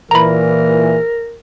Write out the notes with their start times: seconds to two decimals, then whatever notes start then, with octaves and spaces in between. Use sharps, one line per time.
0.11 A#2 E3 A#4 A#5 B5